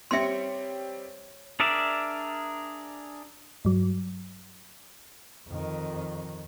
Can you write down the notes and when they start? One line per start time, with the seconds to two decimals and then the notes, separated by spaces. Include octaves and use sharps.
0.11 G3 C4 C#5 E5 C6 C#7
1.60 D4 G#4 A#4 D5 E5
3.65 G2 F#3
5.48 F2 D#3